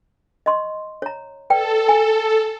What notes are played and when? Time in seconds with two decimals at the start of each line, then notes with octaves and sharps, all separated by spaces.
0.46 D#5 C6 C#6
1.02 C#5 A#5
1.50 A4 B4 D5 G5
1.88 G#5